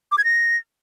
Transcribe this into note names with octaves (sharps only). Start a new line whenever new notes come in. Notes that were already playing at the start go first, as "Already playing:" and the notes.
D6
G#6
A#6